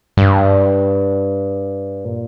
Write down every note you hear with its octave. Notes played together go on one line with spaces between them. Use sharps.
G2
A#2